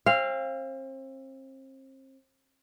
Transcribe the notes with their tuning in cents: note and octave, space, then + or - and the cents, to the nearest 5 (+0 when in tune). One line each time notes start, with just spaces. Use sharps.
C4 +35 F5 -10